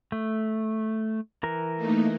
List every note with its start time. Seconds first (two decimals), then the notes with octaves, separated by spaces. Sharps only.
0.12 A3
1.43 E3 A#4
1.77 A3 A#3 D#4